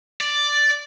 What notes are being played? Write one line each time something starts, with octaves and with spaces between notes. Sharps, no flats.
D5